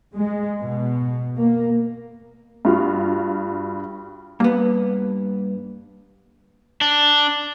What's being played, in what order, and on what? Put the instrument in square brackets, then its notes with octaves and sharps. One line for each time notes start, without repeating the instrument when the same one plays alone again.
[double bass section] G#3
B2
A#3
[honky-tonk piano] G2 F4 F#4
[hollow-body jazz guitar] G2 B3 [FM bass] A#3
[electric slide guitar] D4